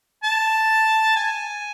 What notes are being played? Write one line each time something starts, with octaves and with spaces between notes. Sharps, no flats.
A5
G#5